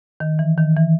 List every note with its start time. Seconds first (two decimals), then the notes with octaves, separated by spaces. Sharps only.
0.20 D#3
0.39 E3
0.58 D#3
0.77 E3